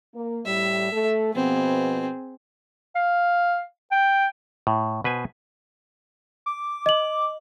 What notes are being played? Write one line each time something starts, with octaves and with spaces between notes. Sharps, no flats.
A#3
A2 G3 E5
A3 A4
B2 F3 B3 C4 G#4
F5
G5
A2
B2 B4 C5 G#5
D6
D#5 F#7